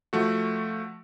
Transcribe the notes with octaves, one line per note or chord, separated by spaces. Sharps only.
F3 A3 F#4